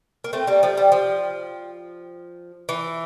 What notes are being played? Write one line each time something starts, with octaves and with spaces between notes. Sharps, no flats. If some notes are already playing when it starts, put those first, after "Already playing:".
A#3
A3 C4
G3 A#3
F3 A3
G3
F3
E3